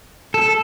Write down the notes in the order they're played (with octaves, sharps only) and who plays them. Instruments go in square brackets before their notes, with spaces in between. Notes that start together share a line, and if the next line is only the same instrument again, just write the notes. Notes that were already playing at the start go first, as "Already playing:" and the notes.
[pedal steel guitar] A4